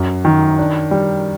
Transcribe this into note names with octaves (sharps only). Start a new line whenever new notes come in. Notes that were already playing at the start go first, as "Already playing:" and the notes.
Already playing: F#2
D#3
D4
G3